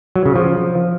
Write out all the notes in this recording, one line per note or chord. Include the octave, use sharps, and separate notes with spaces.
F#3
C#3
F3